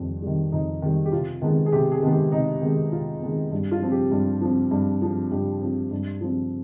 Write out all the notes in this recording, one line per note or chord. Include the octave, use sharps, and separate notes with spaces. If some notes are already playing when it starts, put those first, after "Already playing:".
Already playing: F2 D#3 G3
D#3 G3
F2 D#4
D#3 G3
G4
C3 F4
D#3 G#3 B3
G#4
C3 G4
G#4
D#3 G#3 B3
G4
C3 D#4
D#3 G#3 B3
C3 F4
D#3 G#3 B3
G2
F4
F3 C4
G4
G2
F3 C4
G2
F3 C4
G2 G4
F3 C4
G2
F3 C4